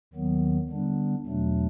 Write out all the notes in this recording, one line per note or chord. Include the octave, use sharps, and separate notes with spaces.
D#2 D#3 F#3 B3
D3 G3 B3 D4
E2 B2 F#3 A3 D4